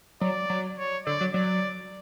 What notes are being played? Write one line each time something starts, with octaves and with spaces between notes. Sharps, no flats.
F#3 D5
F#3
C#5
D3 D5
F#3
F#3 D5